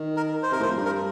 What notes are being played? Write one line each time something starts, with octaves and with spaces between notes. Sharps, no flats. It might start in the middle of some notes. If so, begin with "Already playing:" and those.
Already playing: D#3
A#4
C5
C3 A#4
A2 C5
F2
G2
A#4